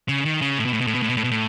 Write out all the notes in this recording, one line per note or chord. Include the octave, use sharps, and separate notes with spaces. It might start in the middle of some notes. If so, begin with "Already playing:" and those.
C#3
D#3
C#3
A2
B2
A2
B2
A2
B2
A2
B2
A2
B2
A2